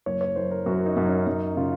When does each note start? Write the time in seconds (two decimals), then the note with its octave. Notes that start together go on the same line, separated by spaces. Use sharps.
0.06 F#1 C#5
0.21 C#5
0.36 F#1 C5
0.51 A#4
0.66 F#2 F#4
0.86 D#4
0.96 F#2
1.06 C#4
1.26 F#2 D#4
1.56 C#3 F4